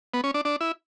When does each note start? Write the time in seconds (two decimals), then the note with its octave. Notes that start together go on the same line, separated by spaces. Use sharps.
0.14 B3
0.24 C#4
0.34 D4
0.45 D4
0.61 E4